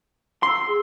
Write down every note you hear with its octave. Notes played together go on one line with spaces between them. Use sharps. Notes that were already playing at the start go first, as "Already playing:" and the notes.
C6 E6
G#4